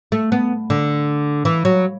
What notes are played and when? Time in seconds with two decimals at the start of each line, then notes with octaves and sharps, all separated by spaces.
0.12 A3
0.32 B3
0.70 D3
1.45 E3
1.65 F#3